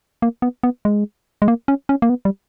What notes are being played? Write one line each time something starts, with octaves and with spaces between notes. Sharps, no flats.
A#3
B3
B3
G#3
G#3
A#3
C#4
C#4
A#3
B3
G3